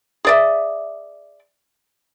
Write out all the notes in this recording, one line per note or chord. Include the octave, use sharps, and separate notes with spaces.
G#4 D5 E5